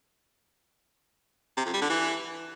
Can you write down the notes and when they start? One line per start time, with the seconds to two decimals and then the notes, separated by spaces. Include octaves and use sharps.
1.57 C3
1.65 F2
1.73 G3
1.82 D3
1.90 E3